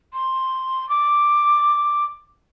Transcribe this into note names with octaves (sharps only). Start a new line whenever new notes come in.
C6
D6